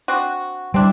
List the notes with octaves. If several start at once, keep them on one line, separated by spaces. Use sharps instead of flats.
C4 D4 F#4
G3 C4 D4 E4